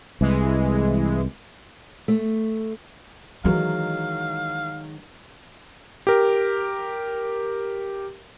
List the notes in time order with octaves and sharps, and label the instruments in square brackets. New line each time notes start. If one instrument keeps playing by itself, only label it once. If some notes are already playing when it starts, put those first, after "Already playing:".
[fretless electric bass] C2 [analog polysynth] E3 G#3
[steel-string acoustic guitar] A3
[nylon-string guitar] D#3 F#3 G#3 [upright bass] E3 E4 [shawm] F5
[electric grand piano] G4 A#4